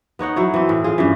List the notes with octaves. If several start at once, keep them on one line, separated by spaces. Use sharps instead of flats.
B3 D#4 C#5 F#5
F#3 E4 C#5
E3 C4
A2
F4 G#4
G2 C#3 E3